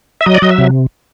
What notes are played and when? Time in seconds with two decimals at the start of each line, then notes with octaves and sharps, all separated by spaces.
0.21 E5
0.26 F#3 D#5
0.35 D5
0.42 F#3 D#5
0.51 E5
0.58 C3